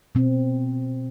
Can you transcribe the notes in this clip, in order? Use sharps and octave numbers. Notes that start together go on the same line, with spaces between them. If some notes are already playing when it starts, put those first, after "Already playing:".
B2 C4